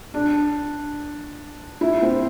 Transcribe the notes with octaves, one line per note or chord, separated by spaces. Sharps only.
D4
E4
C4